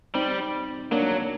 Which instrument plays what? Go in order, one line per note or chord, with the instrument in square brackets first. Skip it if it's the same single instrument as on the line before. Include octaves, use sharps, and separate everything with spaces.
[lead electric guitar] G3 [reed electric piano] C4 D#4
[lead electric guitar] F#3 [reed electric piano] A#3 D4